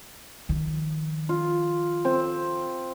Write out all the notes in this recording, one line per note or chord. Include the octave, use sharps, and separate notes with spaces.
D#3 F3
F4
C4